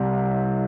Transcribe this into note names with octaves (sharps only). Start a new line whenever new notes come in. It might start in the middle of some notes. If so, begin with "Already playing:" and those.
Already playing: C2 C3 G3